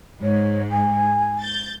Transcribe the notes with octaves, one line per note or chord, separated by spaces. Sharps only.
G#2 C#5
G#5
G6 A6